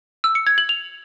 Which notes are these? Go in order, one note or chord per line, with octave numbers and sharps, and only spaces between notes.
E6
C#7
G#6
F#7
F7